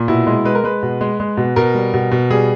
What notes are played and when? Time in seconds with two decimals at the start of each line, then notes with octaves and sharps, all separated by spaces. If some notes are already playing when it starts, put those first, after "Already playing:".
Already playing: A#2
0.08 B2 E4
0.27 G#3
0.45 G#3 B4
0.55 A#4
0.64 G#3 B4
0.83 B2
1.01 G#3
1.20 G#3
1.37 B2
1.56 B2 A#4
1.75 G3
1.94 B2
2.11 B2
2.30 G3 G#4